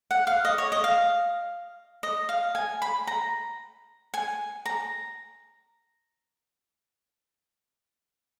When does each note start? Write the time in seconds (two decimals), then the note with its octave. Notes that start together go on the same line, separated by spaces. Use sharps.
0.11 F#5
0.27 F5
0.45 D#5
0.58 C#5
0.72 D#5
0.84 F5
2.03 D#5
2.29 F5
2.55 G#5
2.82 B5
3.07 A#5
4.14 G#5
4.65 A#5